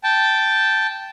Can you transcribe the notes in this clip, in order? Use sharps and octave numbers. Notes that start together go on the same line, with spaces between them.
G5 A5